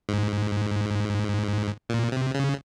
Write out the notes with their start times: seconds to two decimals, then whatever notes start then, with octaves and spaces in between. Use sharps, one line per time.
0.09 G#2
1.89 A#2
2.12 C3
2.34 C#3